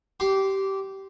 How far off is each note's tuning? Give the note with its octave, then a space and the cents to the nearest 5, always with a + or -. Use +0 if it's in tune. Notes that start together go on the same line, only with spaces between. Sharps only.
G4 -20 C6 +0